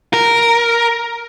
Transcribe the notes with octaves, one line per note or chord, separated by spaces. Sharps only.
A#4